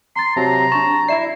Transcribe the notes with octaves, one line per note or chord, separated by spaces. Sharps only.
A#5 C6 A6
C3 F#3 A5 A#5
D4 A5 C#6
E4 D5 E5 C7 E7